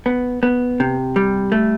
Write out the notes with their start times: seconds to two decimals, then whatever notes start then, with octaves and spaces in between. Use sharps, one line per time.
0.06 B3
0.43 B3
0.80 C3
1.16 G3
1.52 A3